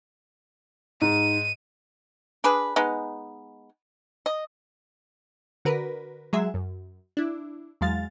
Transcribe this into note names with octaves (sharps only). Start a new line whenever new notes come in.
G#2 D#7
D4 G#4 B4
G#3 B3 D#4
D#5
D3 F#4 A#4 B4
F#3 G#3 G#4 E5
F#2
D4 E4
E2 F#3 G#3 F5 A6